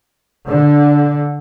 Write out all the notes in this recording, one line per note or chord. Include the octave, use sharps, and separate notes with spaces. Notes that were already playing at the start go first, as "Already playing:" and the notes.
D3